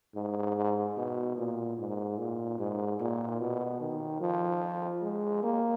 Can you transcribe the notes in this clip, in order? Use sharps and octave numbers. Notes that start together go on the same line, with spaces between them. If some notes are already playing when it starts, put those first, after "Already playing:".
G#2
B2
A#2
G#2
A#2
G#2
A#2
B2
D#3
F3
G#3
A#3